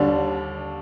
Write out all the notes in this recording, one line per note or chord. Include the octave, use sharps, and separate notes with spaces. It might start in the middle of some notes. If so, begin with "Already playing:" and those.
Already playing: D#2 D3 G3 D4